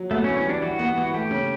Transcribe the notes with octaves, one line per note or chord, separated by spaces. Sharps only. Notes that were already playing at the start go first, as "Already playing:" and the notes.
Already playing: F#3
A3 B3
C#4
E3
C#4
G3 D4
E3 F#4
B3
E3
A3 G4
C#3